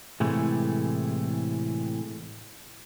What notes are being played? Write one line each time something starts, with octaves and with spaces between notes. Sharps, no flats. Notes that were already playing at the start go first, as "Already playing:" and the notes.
A2 C3 E3 G#3 A3